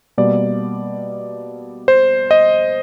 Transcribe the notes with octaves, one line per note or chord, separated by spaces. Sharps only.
B2 G3 A#3 D5
C5
D#5